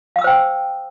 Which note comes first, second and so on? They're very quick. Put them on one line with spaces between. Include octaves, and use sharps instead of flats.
F5 D#6 E6 C5 G5